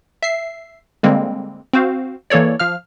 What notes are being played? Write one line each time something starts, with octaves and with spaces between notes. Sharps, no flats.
E5 C7
D3 G3 G#3 A#3 C4
C4 F#4 C5 F5
E3 A#3 A4 C#5 D5
F3 F5 F6